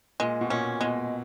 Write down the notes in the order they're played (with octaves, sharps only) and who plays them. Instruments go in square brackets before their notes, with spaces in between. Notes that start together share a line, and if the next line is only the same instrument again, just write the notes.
[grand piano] A#2 [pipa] G#3
[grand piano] B2
[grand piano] A#2 [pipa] C#4
[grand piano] B2 [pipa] G#3